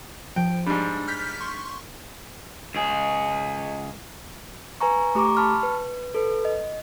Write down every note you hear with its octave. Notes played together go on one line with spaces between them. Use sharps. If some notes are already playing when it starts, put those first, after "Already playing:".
F3 G5
G#2 G3 D4
F6 G6 B6
C6 C#6
C#2 G#4
B4 G#5 A#5 C#6
A3 G4 A#5 C#6 D6
A5 B5 C#6 F6
B4
A4 B4
D#5